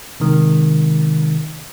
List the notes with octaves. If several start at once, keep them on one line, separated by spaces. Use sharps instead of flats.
C3 D#3 G#3